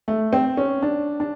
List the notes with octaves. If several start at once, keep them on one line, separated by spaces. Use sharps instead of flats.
A3
C4
C#4
D4
D4